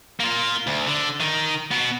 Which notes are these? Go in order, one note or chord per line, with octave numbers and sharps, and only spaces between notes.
A#3 F4
D2
D3
D#3
B2 B3